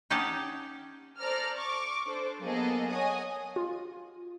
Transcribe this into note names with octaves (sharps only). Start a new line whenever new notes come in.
C#4 D#4 G4 F#5 A5
A4 C5 D5 A#5 F6
C#6 D6
D4 A4 C5
F#3 A#3 B3 G#4 A4 D#5
C#5 D#5 F#5 G#5 D#6
F4